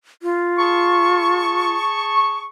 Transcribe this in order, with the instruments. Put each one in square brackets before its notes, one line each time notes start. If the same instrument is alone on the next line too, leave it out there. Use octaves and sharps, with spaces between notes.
[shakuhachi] F4
[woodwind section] G#4 A5 C#6